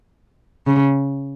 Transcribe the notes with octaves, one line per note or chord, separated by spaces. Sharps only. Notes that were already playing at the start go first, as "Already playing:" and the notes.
C#3